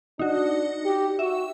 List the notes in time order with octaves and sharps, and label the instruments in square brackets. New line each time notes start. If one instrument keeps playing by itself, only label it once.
[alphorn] D4 [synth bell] D#4 F#4
[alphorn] G4
[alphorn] F#4 [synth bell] E5